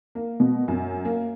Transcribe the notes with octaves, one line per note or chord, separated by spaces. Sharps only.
A#3
B2
F#2
A#3